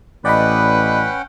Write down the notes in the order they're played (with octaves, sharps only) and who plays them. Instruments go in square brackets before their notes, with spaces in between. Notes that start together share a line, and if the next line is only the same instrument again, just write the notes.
[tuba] A1 [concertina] C#4 F#5 G5 [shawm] B4 [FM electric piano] D5 D#5 B5